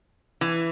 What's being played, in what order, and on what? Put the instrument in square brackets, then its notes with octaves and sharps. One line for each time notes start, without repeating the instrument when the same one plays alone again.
[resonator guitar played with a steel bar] E3